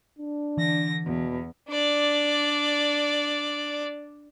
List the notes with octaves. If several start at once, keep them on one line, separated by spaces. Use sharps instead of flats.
D4
D3 E3 A#6
E2 B2
D4 D5